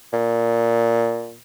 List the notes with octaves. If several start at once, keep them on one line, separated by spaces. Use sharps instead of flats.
A#2